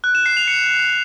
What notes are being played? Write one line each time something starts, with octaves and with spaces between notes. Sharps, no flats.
F#6
E7
C7
F7
C#7